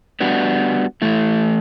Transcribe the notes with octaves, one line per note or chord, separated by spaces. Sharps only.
G3 B3 D4 F#4
E3 A3 E4